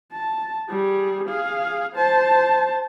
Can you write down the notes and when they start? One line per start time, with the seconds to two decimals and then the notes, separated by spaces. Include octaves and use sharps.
0.12 A5
0.69 G3 G#4
1.28 G#4 F5
1.95 C5 A5